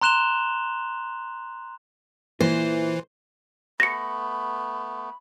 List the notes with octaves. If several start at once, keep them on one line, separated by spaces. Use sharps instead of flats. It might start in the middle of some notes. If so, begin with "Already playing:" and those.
A#5 C6 F#6 E7 F7 G7
A#2 E3 E4 C5
A3 B3 B5 A#6 C#7